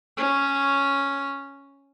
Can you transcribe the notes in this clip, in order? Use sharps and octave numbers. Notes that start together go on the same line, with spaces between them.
C#4 C#5